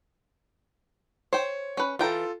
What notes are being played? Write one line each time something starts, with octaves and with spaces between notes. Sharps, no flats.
C5 C#5 G5
C#4 B4
E3 F4 A4 G5 A#5